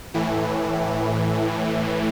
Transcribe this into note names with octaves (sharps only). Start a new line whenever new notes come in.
A2 E3